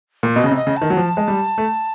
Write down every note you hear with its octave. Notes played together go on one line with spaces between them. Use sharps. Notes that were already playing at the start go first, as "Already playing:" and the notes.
A#2
B2 D#5
C#3
C3
D#5
C#3
D#3 A5
F#3
F3
G#3
G3
A3